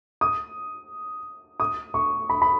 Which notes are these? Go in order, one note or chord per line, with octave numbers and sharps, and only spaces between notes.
D#6
D#6
C#6
B5
B5